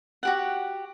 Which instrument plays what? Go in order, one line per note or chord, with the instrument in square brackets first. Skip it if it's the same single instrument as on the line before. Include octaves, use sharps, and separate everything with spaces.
[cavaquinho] F#4 G4 F#5